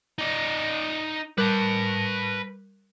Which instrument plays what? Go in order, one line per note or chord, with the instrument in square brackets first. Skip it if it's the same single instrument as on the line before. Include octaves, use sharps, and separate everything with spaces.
[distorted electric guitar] D#4 D5
[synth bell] G3 A#4 F#6 [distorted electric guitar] B4 A5